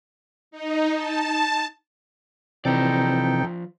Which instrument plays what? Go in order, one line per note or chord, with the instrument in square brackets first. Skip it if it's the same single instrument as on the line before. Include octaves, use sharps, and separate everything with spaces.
[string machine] D#4
A5
[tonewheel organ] C3 E3 C4 [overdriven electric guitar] F3 D5 [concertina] D#4 A4 G5